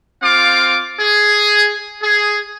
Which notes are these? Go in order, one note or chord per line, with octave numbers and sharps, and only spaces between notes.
C4 F4 F5 D6
G#4
G#4